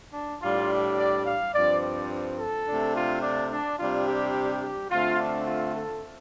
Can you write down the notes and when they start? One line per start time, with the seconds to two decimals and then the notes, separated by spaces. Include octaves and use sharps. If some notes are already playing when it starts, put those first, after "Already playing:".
0.14 D4
0.42 A2 G3 D4 F4
0.98 D5
1.26 F5
1.54 G2 F3 C4 D5
1.82 D5
2.39 A4
2.67 C3 A3 D4
2.94 F4
3.23 D4
3.50 D4
3.78 C3 G3 D4 F4
4.07 G4
4.63 G4
4.91 D3 A3 C4 F4
5.19 D4
5.47 F4
5.75 A4